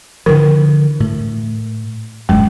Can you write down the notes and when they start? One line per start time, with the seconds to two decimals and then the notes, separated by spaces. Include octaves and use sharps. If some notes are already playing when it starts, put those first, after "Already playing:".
0.26 D3 E3 F3 A#4
1.00 A2
2.29 D#1 F#2 G#3